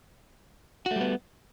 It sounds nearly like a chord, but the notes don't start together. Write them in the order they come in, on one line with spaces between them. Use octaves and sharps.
F#4 A3 G3 B3